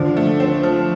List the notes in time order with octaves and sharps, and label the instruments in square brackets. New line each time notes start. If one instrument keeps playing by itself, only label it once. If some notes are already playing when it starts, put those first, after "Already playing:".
Already playing: [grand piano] D3 D4 [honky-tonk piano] F3
[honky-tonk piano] A3
C4
F3